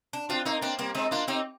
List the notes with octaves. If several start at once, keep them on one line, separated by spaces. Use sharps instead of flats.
D4
C4 D4 F4
A#3 C4 D#4
A#3 C4 D4
G3 A#3 C4
G#3 C4 D#4
A#3 D4 F4
C4 D#4 G4